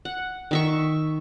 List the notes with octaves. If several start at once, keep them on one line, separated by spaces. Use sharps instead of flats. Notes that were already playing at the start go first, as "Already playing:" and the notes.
F#5
D#3 E5 C#6